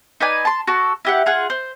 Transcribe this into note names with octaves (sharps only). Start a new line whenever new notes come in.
D#4 B4 D5 G#5
A5 C6
F#4 A4
E4 G4 F#5
F4 G#4 F#5
C5